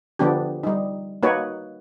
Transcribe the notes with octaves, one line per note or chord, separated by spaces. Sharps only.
D3 F3 B3 D4 G4
G3 D#4
A#3 D#4 F#4 B4 C#5